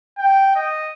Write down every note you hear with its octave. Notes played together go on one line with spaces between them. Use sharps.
G5
D#5